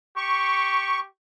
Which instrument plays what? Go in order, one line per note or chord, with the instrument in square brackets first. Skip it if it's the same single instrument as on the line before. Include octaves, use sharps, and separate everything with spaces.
[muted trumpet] G4 [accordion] C#6